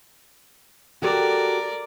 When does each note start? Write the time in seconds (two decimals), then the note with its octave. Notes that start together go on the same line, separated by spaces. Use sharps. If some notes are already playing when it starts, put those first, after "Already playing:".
1.02 F#4 G4 A4 A#4 D5